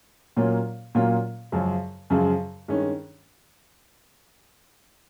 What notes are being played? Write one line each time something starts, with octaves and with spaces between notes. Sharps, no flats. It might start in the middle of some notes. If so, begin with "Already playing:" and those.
A#2 F#3 A#3 C#4 F4
A#2 F#3 A#3 C#4 F4
F#2 C#3 F3 G#3
F#2 C#3 F3 G#3
G2 D#3 G#3 C#4